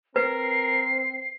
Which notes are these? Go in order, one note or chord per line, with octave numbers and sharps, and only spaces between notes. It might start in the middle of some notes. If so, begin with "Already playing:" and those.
C4 A#4 B4 C7